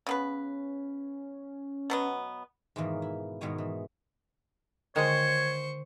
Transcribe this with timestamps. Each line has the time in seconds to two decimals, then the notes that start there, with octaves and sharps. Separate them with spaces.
0.07 C#3 B3 C#4 B4
1.90 B2 F#3 B3
2.76 G#2 B2 D#3 E3 A#3
3.02 E4
3.41 G#2 B2 D#3 G#3 C#5 G#5
3.58 E3
4.96 D3 D#3 G#3 G#4 C5 C#5 C#6